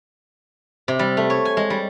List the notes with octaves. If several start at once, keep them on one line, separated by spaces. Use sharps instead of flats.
C3
G3
A3
C#5
G#5
G#3
G3